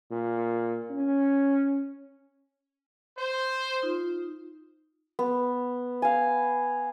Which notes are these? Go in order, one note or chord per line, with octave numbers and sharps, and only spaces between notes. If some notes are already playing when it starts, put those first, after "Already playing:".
A#2
C#4
C5
D#4 F4
B3
F5 G#5